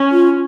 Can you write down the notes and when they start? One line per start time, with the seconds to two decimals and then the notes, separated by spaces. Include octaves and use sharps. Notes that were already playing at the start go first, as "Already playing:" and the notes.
Already playing: C#4
0.12 F4